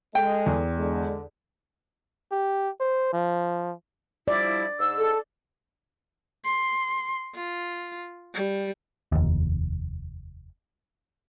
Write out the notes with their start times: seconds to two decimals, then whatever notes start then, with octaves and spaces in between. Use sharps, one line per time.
0.15 G#3 A4 G5
0.46 E2
0.77 D3 G#3
2.31 G4
2.80 C5
3.13 F3
4.28 F3 G3 E4 D5
4.80 G#2 E6
4.98 A4
6.45 C6
7.35 F4
8.34 G3
9.12 F1 D#2